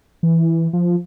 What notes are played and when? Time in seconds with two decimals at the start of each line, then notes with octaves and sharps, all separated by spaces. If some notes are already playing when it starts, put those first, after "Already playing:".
0.23 E3
0.73 F3